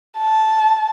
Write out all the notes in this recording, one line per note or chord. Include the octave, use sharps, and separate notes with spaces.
A5